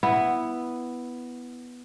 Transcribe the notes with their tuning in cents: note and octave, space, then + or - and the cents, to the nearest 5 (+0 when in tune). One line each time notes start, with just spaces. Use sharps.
B3 +0 E4 +0